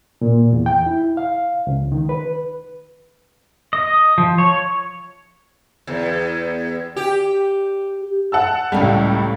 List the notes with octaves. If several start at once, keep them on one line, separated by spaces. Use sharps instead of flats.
A#2
E2
G5
E4
F5
C#2
D#3
B4
D#5
F3
C#5
E2
G4
F#5 A5 E6
C#2 A2 G3 C#4 F5